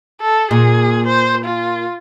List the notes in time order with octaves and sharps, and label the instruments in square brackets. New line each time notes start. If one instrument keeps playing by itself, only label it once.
[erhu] A4
[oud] A#2 [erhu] G#4
[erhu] C5
F4